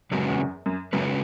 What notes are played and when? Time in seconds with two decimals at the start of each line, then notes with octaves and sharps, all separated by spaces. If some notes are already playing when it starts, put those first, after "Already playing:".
0.11 F#2 C#3 G#3 C#4 F#4 B4
0.29 E2
0.39 F#2
0.66 F#2
0.93 F#2 C#3 G#3 C#4 F#4 B4